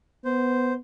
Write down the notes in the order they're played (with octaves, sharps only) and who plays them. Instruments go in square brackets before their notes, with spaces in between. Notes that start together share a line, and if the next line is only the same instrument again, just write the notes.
[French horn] B3 [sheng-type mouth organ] C5